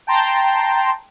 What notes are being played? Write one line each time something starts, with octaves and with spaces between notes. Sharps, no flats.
G5 A5 A#5 C6